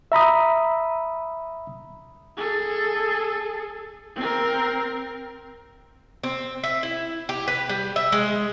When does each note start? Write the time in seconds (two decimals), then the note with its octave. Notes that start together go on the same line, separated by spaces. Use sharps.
0.12 E5 A#5 B5 D#6
2.36 G#4 A4
4.15 C4 A#4
6.24 C4
6.64 E5
6.83 E4
7.29 G4
7.48 B4
7.69 G3
7.96 E5
8.12 G#3